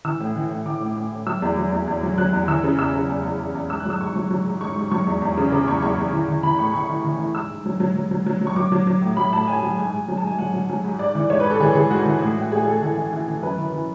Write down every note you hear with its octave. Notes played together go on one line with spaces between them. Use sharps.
E3 E6
A2
E3
A2
E3 D6
A2
A2
A2
F#3 E6
E2
F#3
E2
E2
F#3
F#3 F#6
E2
E3 E6
C#3
E2 E6
C#3
E2
E2
E2
E2
G#2 E6
F#6
F#3 E6
G#2 C#6
F#3
F#3
G#2
G#2 C#6
G#2
F#3 C#6
E2
E2
C#3
C#3 D6
E2 C#6
E2 C#6
E2
E3
E3
E3 B5
A2 C#6
E3 C#6
E3
E3
E3
G#2 E6
G#2
F#3
F#3
F#3
F#3
F#3
F#3
C#6
F#3 D6
F#3
F#3
A2
F#3 B5
A2 A5
A2 G#5
F#3
G#2 G#5
G#2
F#3
A5
G#2 G#5
F#3 F#5
F#3
F#3
G#2
G#2 D5
E3
G#2 C#5
B4
G#2
A4
E3 G#4
E3 G#4
G#2 F#4
E3
A2
A2
A2 G#4
G#4
A2 A4
E3 A4
E3
E3
E3
F#2 B4
E3
E3